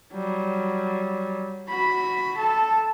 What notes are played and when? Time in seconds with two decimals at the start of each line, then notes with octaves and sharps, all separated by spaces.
0.13 F#3 G3
1.69 F#4 B5
2.37 A4 A5